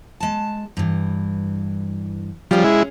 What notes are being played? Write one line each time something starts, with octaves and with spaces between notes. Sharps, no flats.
G#3 A5
G2 E3
F3 G3 C#4 G#4
G#3 E4